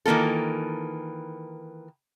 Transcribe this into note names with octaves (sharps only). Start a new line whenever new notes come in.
D#3 E3 A#3 F4 A4